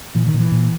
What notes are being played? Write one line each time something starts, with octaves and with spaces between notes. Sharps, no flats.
A#2 E3
D#3
A#2
E3
A#2